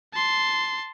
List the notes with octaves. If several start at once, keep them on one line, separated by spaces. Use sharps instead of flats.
A5 C6